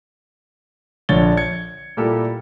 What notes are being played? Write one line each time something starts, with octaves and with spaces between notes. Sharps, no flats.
A#1 D3 D4 C#5 A6 G7
G#6 C#7
A#2 G3 E4 G4 A4